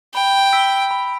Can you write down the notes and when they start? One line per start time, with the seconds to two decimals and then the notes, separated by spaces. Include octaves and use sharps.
0.14 G5 B5
0.53 E6 B6 D7
0.91 B5